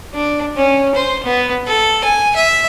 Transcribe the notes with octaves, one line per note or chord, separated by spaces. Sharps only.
D4
C#4
C5
B3
A4
G#5
E5